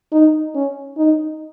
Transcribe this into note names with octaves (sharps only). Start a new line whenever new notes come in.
D#4
C#4
D#4